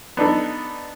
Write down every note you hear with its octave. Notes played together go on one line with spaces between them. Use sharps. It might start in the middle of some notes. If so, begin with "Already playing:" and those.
B3 D4 D#4 A4